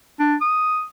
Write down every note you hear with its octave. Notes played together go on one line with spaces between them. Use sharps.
D4
D#6